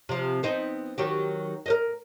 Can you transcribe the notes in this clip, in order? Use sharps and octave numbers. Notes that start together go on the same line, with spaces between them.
C3 F3
B3 C4 D#4
D#3 F#3 G4
A#4 C5 D#5